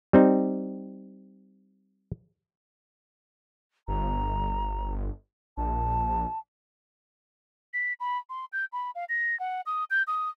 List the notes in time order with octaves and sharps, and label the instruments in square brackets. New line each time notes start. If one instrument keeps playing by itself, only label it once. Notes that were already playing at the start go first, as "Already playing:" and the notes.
[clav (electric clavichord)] G3 C4 D#4
[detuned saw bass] G1 [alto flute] A#5
[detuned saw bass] A#1 [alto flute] A5
[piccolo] B6
B5
C6
G6
B5
F5
A#6
F#5
D#6
G6
D#6